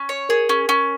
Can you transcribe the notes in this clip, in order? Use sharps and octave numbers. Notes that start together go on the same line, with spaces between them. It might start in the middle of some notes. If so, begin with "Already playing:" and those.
Already playing: C#4
C#5
G#4 A#4
C#4
C#4